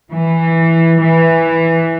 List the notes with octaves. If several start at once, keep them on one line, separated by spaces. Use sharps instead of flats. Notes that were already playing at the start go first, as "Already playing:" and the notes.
E3
E3